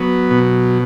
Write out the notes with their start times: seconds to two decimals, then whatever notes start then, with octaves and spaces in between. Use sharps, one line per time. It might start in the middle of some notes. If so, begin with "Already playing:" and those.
Already playing: F#3 B3
0.31 B2